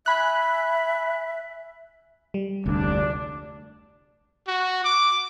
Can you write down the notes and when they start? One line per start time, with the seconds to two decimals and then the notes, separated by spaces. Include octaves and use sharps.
0.06 E5 G#5 B5 F#6
2.34 G3
2.66 F1 D2 D4
4.48 F#4
4.84 D6